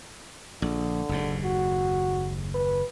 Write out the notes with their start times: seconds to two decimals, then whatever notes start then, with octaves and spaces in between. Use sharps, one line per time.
0.62 A#1 D3
1.09 F#1 D#2 G#2
1.44 F#4
2.55 B4